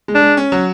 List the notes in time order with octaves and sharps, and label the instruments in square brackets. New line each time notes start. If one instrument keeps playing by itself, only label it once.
[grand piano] G#3
[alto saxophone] D4
[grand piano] G#3
C#4
F#3